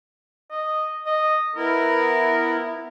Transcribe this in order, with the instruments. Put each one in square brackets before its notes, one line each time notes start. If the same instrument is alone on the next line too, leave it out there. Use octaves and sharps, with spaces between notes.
[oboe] D#5
D#5
[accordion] B3 E4 [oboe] A#4